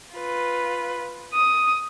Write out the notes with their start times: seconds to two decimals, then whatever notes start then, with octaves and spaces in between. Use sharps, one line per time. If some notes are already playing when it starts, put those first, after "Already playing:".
0.15 F4 B4
1.33 D#6